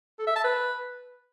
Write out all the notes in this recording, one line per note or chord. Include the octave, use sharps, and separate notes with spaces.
A4
E5
A5
B4